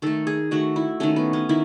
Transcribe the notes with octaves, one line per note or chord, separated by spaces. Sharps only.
D#3 A3 A4
G#4
D#3 A3 F#4
E4
D#3 A3 C#4
B3
C#4
D#3 E4